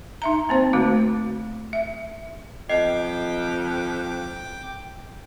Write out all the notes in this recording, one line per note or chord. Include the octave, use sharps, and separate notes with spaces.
D#4 E5 A#5
A#3 C4 C5
D3 A3 F#4
E5
F2 D#5 G5 D6 C7